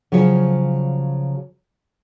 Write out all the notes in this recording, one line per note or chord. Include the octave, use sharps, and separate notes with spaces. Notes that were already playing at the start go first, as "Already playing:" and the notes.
C#3 F3 F#3 C#5